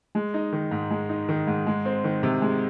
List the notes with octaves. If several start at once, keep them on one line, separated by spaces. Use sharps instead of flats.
G#3
D#4
D#3
G#2
G#3
D#4
D#3
G#2
G#3
C4
D#3
C3
G#3